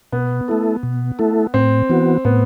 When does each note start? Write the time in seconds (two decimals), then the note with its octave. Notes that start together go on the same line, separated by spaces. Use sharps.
0.12 B2 B3
0.48 A3 E4 A4
0.83 B2
1.19 A3 E4 A4
1.54 A2 C4
1.89 E3 B3 F#4
2.25 A2 B3